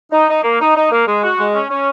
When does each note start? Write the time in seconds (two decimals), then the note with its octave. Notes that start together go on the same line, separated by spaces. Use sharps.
0.12 D#4
0.29 D#4
0.44 A#3
0.60 D#4
0.76 D#4
0.91 A#3
1.07 G#3
1.24 F#4
1.38 G#3
1.54 C#4
1.70 C#4